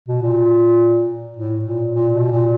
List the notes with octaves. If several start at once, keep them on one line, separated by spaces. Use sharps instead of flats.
B2
A#2
A2
A#2
A#2
B2
A#2